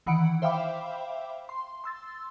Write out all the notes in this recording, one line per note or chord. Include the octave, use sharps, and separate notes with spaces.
D#3 E3 F#5 B5 C#7 D7
C5 E5 F5 G5 B5 D6
C6
C6 E6 A6